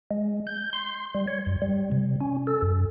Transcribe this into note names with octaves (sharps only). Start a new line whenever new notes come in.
G#3
G6
C6
G3
C#5
F#2
G3
C3
C#4
A4
F#2